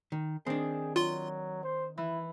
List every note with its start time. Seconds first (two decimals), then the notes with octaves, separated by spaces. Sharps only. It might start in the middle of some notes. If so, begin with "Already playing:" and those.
0.12 D#3
0.46 D#3 C4 D4 G#4
0.96 F#3 F4 C6
1.63 C5
1.98 E3 E4